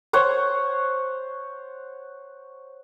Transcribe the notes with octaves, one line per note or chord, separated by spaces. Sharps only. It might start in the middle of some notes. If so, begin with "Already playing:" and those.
C5 C#5 F#5 C6